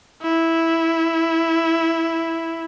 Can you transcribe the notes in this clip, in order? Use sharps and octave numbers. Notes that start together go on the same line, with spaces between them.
E4